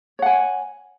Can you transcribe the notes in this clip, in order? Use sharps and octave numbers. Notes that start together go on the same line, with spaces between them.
C#5 F#5 G#5